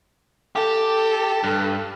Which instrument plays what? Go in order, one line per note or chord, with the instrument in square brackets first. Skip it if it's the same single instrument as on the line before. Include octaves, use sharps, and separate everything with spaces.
[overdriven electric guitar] G4 [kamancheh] A4
[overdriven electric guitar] G2